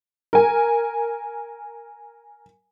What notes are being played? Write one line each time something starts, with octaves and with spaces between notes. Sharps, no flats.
A#4 G#5